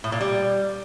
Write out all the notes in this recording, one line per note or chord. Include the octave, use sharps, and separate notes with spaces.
A2
A#2
G3